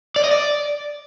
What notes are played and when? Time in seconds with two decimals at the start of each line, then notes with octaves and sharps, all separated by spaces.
0.16 D5
0.24 D#5
0.31 D5